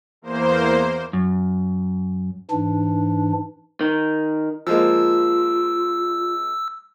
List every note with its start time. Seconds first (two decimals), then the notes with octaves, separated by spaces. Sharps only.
0.22 E2 A#3 C5
1.13 F#2
2.51 G#2 E3 D4
3.81 D#3
4.67 F3 G#3 A#3 F4 E6